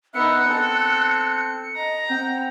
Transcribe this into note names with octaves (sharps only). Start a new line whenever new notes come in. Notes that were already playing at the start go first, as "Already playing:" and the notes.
B3 D#4 E5 F#6 C#7
C4 A4
D#5 A#5
C4 F#5 G5